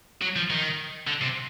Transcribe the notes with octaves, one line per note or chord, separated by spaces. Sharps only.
F#3
F3
D#3
D3
C3